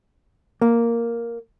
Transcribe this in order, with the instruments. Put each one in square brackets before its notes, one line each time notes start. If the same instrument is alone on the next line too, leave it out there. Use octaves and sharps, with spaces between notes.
[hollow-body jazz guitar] A#3